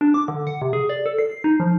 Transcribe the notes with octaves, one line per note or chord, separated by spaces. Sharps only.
D4
D6
D3
F#5
C3
G#4
D5
A4
C7
C7
D#4
F3